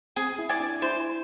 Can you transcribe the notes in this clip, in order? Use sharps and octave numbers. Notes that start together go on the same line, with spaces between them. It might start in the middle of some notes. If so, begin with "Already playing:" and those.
C4 G#4
E4
D5 G#5
D4
E4 C5